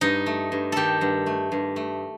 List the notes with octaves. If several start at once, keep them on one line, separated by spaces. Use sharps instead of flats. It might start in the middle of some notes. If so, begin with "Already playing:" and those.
G2 D#4
A3
G2
D#3 G4 A4
G2
A3
G2
A3